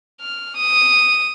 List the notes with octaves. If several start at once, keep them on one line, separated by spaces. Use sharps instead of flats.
F6
D#6